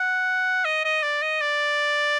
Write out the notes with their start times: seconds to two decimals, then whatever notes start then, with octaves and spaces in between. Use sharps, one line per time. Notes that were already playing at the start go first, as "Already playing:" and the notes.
Already playing: F#5
0.65 D#5
0.85 D#5
1.03 D5
1.22 D#5
1.41 D5